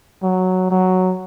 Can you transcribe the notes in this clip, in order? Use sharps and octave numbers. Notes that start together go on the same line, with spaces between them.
F#3
F#3